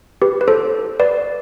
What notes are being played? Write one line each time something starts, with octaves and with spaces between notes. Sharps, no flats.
G4 B4
B4
A4 C5
B4 D5